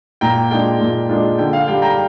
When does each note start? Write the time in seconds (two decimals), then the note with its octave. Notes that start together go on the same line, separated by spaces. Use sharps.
0.21 A#2 G5 A#5
0.51 G#3 D4 F4 G5
0.80 A#2
1.09 G#3 D4 F4
1.38 D3 G5
1.53 F5
1.67 G3 D4 G5
1.82 G5 A#5